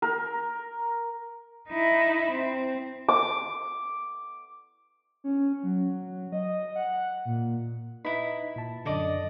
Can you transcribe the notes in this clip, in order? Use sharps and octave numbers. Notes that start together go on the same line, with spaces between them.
A#4
D#4 E4
C4
D6
C#4
F#3
D#5
F#5
A#2
D#4 E4 B4 D#5 B5
A#2 A5
F#2 D3 D5 D#5 A5